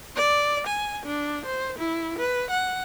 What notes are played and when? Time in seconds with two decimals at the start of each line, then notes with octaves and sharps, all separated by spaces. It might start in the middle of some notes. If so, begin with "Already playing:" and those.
0.16 D5
0.67 G#5
1.06 D4
1.46 C5
1.79 E4
2.18 B4
2.51 F#5